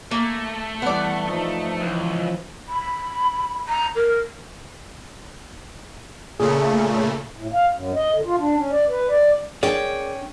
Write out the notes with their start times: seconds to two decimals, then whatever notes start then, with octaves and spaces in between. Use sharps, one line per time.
0.11 A3 A#3
0.82 E3 G3 B3 D5 F#5
1.29 F3 D#4
1.81 C#2 E3
2.68 B5
3.68 A#5
3.95 A#4
6.40 A#2 C#3 A3 G#4
7.37 A2
7.53 F5
7.72 F#2
7.95 D#5
8.13 D3
8.25 F4
8.39 D4
8.56 C#4
8.71 D5
8.89 B4
9.09 D5
9.63 C#4 G#4 A#4 D5 G5